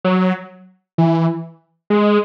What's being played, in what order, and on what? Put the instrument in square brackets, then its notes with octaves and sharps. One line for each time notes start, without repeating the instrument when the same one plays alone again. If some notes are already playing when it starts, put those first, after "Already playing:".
[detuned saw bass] F#3
E3
G#3